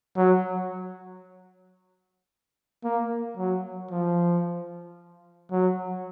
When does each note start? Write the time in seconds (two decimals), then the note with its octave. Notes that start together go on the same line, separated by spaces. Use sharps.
0.17 F#3
2.84 A#3
3.37 F#3
3.91 F3
5.52 F#3